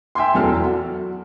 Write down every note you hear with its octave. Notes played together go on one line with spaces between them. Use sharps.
E5 G5 G#5 C6
E2 F#3 A4 F6
F#4